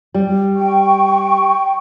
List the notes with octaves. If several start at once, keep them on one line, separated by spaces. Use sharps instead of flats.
G3
G5 C#6